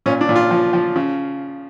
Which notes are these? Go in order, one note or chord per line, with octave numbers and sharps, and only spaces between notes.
A#2 C#4
D4
A#2
F4
F3
F3
C#3